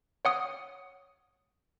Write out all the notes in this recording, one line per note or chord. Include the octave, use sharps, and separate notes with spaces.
C#5 F#5 D#6